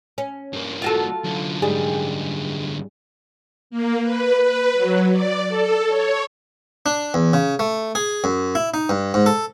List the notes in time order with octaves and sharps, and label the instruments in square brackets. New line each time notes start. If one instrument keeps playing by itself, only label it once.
[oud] C#4
[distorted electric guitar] G2 A#3
[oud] F4 F#4 A4
[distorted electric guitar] F#2 D3
[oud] G#2 G3 G#4
[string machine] A#3
B4
B4
F#3
D5
A4
C#5
[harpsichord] D4
E2
C#3
A3
G#4
F#2
E4
D#4
G2
G#2
A4